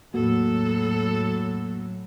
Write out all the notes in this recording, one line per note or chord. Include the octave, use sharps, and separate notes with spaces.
E2 A2 F#3 A#3 F#4 A4